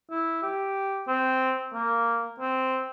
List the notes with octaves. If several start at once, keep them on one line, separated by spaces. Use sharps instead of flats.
E4
G4
C4
A#3
C4